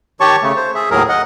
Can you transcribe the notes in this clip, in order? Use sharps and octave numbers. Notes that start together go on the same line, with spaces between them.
D#3 G4 C#5 A5 C#6
C#3 A3
C5
G#4 E5
D#2 A2 F#3 G#4 A#4
D#5 F#5